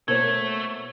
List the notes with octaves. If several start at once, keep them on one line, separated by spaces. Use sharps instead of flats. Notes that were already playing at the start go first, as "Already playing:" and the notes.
B2 A3 A#3 E4 C5 C#5 G#6